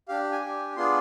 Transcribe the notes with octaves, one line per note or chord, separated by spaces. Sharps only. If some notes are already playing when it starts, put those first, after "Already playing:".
D4 G4 F5
G#5
D4 G4
B3 D4 F4 G#4 C6